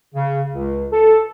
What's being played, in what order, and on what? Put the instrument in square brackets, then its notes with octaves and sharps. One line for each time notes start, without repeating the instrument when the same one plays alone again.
[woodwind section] C#3
C#2
A4